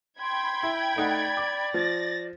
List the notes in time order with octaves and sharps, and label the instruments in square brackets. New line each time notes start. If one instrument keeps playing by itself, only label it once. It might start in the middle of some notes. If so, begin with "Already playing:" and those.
[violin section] G5 B5 G#6 [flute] C6
[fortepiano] E4
[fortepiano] A3 D#4 F#5 [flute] D5
[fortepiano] D6
[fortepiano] F3 [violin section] A6 A#6